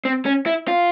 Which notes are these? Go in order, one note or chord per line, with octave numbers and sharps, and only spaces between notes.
C4
C#4
E4
F4